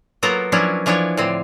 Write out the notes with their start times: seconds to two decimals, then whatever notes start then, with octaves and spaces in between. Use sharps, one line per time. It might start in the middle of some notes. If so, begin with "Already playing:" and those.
0.23 F#3 A#3 B3 F4 A4 A#4
0.52 F3 F#3 C#4 D4 E4
0.86 E3 F3 D4 E4 C#5
1.17 A2 D3 C4